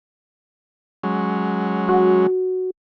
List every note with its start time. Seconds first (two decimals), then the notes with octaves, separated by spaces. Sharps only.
1.03 F#3 G#3 C#4
1.89 F#4